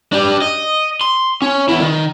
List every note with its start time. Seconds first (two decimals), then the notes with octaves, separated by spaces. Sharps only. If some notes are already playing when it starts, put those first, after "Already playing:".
0.13 D4 G4
0.42 D#5
1.01 C6
1.42 C#4
1.68 E2 E4
1.81 D#3